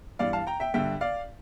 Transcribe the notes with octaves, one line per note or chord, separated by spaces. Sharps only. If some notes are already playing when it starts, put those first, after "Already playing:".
G2 E3 D5 F5
F5 A5
G5 A#5
E5 G5
G2 D3 E5 G5
D5 F5